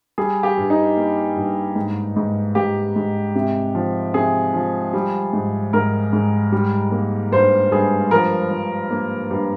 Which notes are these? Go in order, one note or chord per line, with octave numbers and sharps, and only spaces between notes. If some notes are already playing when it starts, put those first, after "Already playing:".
G3 G#4
G4
G2
D#4
A#3
G2
G#2
G#2
G#2 G4
G#2
C3
F3
C3 G#4
F3
G3
G#2
G#2 A#4
G#2
G3
A#3
G2 C5
G2 G#4
F3 A#4
F3
A#3
G2